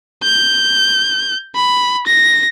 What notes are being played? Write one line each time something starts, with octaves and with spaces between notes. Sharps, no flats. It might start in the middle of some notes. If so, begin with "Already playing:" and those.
G6
B5
A#6